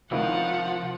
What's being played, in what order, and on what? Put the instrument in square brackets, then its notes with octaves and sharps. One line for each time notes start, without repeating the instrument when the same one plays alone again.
[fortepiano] C#2 D#3 E4 [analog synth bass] C3 [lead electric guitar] F3 [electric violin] F5 F#5